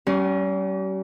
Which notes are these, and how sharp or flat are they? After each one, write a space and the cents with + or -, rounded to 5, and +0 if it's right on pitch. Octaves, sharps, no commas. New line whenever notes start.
G3 -45 C#4 +0 G4 -40